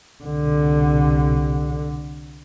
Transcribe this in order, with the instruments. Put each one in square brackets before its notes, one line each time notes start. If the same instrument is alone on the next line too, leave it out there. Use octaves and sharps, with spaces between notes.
[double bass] C2 D3